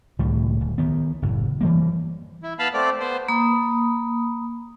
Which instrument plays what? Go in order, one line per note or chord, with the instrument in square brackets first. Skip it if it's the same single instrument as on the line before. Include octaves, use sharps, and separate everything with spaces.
[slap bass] C#2 A2 D#3 G3
D1
D#3 B3
F#1 A2
E3 G3 A#3
[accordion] E4
B3 F5 A5 B5
A3 C4 D5
B3 C5
[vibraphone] A#3 B5 D#6